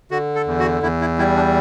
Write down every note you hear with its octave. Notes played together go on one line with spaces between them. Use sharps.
D3 F#4
A4
E2
F#4
E2 E4
E4
G3 E4
D4